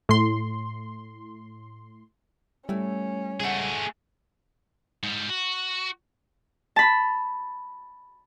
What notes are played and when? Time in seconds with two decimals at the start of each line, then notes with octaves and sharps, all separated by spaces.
0.09 A2 C6
2.69 G3 A3 C#4 E4
3.40 C#2 A3 G#4 F#5
5.03 G#2 G3
5.30 F#4
6.76 A5 B5